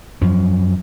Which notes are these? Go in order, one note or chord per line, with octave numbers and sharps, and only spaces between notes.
F#2 F3